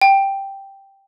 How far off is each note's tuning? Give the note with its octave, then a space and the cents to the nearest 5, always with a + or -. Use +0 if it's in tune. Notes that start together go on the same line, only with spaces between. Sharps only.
G5 +0